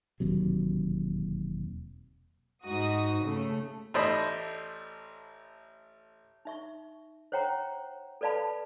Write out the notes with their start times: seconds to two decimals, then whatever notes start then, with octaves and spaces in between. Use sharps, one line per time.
0.20 E1 D#2 C3 F#3
2.64 G#2 D#4 F#4 D#6
3.23 C#3 A3
3.94 A1 A3 C5 D5 D#5 B5
6.45 D#4 E5 C#6
7.32 C5 C#5 F#5 G5 A#5
8.21 A4 B4 D5 F5 A5 B5